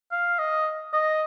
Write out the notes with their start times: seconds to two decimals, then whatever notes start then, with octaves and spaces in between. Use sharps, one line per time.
0.12 F5
0.39 D#5
0.93 D#5